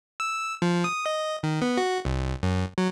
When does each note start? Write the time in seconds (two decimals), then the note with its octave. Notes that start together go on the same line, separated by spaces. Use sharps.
0.20 E6
0.62 F3
0.84 D#6
1.06 D#5
1.43 D#3
1.62 B3
1.77 F#4
2.05 C2
2.43 F#2
2.78 F#3